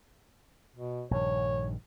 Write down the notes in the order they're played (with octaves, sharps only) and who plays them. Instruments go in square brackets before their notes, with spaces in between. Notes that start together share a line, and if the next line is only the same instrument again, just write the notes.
[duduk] B2
[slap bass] A#1 G2 D#3 [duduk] C#5